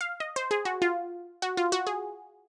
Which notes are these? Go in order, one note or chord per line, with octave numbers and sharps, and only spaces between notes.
F5
D#5
C5
G#4
F#4
F4
F#4
F4
F#4
G#4